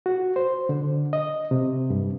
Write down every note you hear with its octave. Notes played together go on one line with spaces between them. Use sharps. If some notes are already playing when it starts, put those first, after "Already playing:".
F#4
C5
D3
D#5
C3
G2